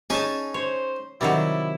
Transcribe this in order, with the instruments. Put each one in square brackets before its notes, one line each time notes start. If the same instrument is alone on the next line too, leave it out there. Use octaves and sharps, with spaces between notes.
[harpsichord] C#4 D#4 G#4 [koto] G#5 A5
[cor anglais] C5 [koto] C#5
[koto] C3 D#3 F#3 [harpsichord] G3 [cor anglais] E4